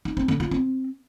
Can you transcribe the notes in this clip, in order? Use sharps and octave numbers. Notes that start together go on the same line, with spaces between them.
D#4
C4
D3
F4
C4